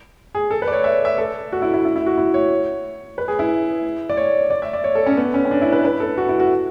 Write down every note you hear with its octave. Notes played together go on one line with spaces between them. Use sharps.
G#4
A4
B4
D5
C#5
E5
E5
A4
F#4
E4
E4
E4
E4
F#4
E4
C#5
B4
G#4
E4
D5
C#5
D5
E5
D5
C#5
A4
C#4
B3
C#4
C#4
D4
E4
B4
B4
A4
F#4
E4
F#4